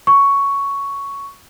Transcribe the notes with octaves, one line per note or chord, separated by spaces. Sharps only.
C#6